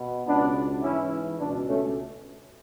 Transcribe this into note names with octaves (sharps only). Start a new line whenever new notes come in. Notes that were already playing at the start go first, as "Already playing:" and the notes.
Already playing: B2
C#2 B2 B3 D4
G#2 E3 C#4 E4
C#2 B2 B3 D4
A3 C#4